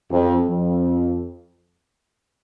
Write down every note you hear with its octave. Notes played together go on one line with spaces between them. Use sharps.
F2
F2